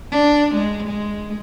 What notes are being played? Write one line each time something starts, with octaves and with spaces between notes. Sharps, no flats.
D4
G#3
G#3